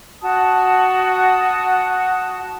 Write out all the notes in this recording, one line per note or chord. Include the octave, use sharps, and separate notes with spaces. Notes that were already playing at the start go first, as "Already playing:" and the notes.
F#4 A5 D#6